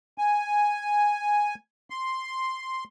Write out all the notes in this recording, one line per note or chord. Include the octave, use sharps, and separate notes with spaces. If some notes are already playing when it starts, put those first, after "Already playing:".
G#5
C6